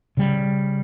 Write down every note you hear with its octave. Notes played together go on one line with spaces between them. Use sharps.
C#3 G3